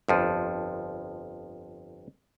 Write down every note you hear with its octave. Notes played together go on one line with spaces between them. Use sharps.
G1 F2 F3